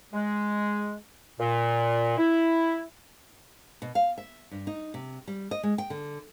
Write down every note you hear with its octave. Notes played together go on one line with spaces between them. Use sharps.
G#3
A#2
E4
B2
F5
E5
G2
D#4
C3
G3
D#5
G#3
G5
D3